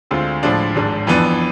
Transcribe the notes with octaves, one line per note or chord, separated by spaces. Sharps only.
D2 D3 G#3 C4 F4
A2 F3 G#3 D4
G#1 G#2 G#3 D4
F2 E3 B3 D4